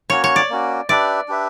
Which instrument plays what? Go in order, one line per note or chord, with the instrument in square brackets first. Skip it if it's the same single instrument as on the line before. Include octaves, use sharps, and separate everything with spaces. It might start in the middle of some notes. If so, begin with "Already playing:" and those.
[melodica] A#3 C#4 F#4 [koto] C#5
[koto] C#5
D5
[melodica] A#3 C#4 F#4
[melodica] D4 G4 B4 E5 [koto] D5
[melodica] D4 G4 B4 E5